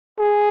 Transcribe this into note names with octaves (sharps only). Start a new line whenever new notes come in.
G#4